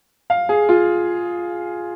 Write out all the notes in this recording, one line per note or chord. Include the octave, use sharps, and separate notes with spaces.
F5
G#4
F4